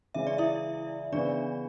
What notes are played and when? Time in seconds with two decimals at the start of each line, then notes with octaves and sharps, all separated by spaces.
0.14 C#3 E3 G#3 C#4 E5
0.27 D5
0.38 E4 E5
1.12 C#3 E3 B3 D4 D5